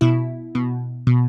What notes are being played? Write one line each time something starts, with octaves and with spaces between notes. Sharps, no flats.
B2 E4
B2
B2